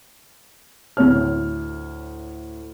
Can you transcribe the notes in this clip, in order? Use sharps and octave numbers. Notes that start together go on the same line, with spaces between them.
D2 A2 C#5 F6